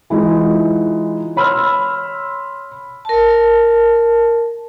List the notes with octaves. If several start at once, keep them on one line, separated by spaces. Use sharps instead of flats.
E3 G#3 D#4 F4
C#5 B5 C6 E6 F6
A#4 A5